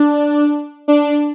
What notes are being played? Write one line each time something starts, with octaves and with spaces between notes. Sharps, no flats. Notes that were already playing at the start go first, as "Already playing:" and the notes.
Already playing: D4
D4